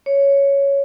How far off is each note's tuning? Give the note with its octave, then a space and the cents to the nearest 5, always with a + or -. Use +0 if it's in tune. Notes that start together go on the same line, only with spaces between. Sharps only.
C#5 +5